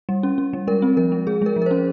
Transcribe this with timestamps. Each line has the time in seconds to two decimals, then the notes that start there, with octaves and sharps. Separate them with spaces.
0.09 G3
0.23 C#4
0.38 C#4
0.53 G3
0.67 G#3 A#4
0.82 C4
0.97 F3 A#4
1.12 G#3
1.27 G#3 G#4
1.42 G#3 A#4
1.56 F3
1.62 A#4
1.66 C#4 C5